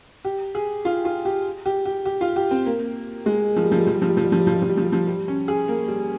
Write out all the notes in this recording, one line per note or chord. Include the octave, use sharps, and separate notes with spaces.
G4
G#4
F4
F4
G4
G4
G4
G4
F4
G4
C4
A#3
G#3
F3
G3
F3
G3
F3
G3
F3
G3
F3
G3
F3
G3
F3
G3
F3
G3
F3
G3
F3
G3
C#4
G#4
A#3
G3